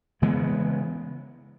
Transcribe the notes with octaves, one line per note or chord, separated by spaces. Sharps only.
C#3 E3 G#3 B3